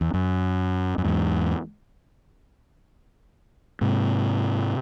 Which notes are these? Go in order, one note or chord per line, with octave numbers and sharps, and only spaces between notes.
E2
F#2
F#2
E2 G#2
G#2 C3